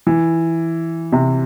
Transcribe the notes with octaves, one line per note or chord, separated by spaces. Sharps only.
E3
C3